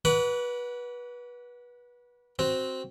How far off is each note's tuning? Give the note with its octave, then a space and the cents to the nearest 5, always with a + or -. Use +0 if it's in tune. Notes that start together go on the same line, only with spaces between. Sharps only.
B4 -25 F#5 +0 C#6 +45
C4 +0 F#4 +5